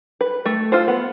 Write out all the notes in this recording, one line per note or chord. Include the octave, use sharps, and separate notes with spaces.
B4
A3
F4 A4 C5
B3